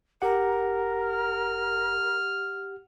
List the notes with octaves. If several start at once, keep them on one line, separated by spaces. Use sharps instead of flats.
F1 G4 A#4 F#5
F6